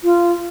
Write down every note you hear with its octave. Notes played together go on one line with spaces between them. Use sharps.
F4